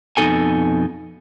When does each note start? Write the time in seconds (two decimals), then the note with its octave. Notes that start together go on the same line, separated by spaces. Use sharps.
0.17 F2 B2 A3 D#4 A4 G#5